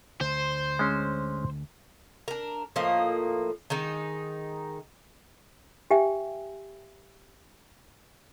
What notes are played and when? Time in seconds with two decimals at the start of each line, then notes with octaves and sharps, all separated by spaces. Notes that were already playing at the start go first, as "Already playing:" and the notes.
0.21 D2 C5
0.79 G#3 C#4
2.28 D4 A#4
2.76 A2 F3 A#3 D#5
3.70 D#3 G#3 D#4
5.91 G4 E5 G5 G#5